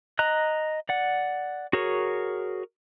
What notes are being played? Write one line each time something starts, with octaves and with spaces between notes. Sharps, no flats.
D#5 A#5 F#6
D5 F#5
F#4 G#4 A#4 C#5